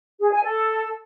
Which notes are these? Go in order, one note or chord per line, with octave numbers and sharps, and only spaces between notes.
G#4
G#5
A4